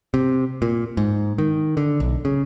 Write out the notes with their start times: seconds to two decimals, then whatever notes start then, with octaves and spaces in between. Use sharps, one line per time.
0.14 C3
0.62 A#2
0.97 G#2
1.38 D#3
1.77 D3
2.00 B1
2.25 C#3